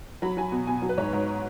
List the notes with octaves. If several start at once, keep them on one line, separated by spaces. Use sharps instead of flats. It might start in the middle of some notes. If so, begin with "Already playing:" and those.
F#3 B5
F#3 G#5
B2
B2 G#5
F#3
B4
G#2 C#5
G#2